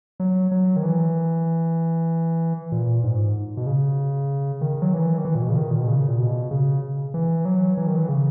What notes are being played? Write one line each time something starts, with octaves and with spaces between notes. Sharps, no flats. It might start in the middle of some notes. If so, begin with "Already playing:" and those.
F#3
F#3
D#3
E3
A#2
G#2
B2
C#3
D#3
F#3
E3
D#3
E3
A#2
B2
C#3
D#3
A#2
B2
C#3
A#2
B2
C#3
E3
F#3
E3
D#3
E3
C#3